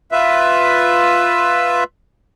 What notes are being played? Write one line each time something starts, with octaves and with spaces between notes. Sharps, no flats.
F4 B4 E5